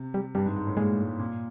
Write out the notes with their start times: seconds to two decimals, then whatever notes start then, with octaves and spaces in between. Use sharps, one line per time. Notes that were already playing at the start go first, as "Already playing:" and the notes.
Already playing: C3
0.14 G3
0.35 G2 G3
0.46 G#2
0.56 G#2
0.67 A2
0.77 A#2 G#3
1.19 A#2